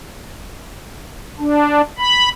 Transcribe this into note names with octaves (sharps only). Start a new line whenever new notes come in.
D4
B5